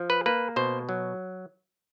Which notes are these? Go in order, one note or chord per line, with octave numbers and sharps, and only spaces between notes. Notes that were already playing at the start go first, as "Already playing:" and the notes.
Already playing: F3
B4
A#3 B4
B2 C5
F#3